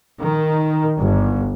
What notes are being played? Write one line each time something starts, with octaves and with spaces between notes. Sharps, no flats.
D#3
G1